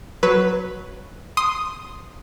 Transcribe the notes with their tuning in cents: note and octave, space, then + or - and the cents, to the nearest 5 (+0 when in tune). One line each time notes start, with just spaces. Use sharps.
F#3 +0 B4 +0
C6 +0 D#6 +0